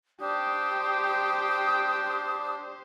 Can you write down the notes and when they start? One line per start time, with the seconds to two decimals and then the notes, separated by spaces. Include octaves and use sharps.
0.20 D4 G4 C5 G5 D#6